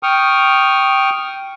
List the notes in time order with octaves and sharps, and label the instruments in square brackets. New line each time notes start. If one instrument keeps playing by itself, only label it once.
[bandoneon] G5 C#6 D#6 F6